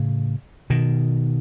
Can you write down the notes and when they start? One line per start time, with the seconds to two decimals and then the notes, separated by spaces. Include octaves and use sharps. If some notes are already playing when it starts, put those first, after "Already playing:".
Already playing: A2 C#3
0.70 B2 D#3